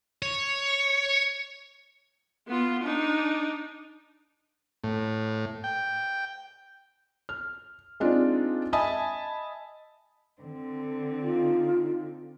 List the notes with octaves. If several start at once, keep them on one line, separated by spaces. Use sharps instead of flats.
C#5
B3 F4
D4 D#4
A2
G5
F6
G#3 C4 D4 D#4 F4
D#5 E5 G#5 A5 B5 D#6
D3 C4
D#4 F4